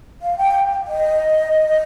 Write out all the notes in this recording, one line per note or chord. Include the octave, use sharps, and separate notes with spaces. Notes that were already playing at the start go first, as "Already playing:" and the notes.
F5
G5
D#5